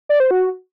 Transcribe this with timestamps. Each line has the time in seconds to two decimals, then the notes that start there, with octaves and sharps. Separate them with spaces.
0.09 D5
0.20 C5
0.31 F#4